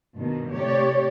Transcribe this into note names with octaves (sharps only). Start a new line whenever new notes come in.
G2 B2 D#3
A2 C3 G4 C#5 D5